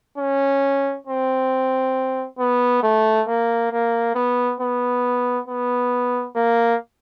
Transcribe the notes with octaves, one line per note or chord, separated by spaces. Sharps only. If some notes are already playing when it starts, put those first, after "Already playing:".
C#4
C4
B3
A3
A#3
A#3
B3
B3
B3
A#3